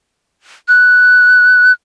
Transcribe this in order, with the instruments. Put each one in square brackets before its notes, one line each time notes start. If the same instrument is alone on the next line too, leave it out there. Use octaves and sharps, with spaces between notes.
[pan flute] F#6